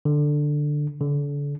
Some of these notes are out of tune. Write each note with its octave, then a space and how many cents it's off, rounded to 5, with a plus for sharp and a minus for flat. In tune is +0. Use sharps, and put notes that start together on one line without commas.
D3 +10
D3 -35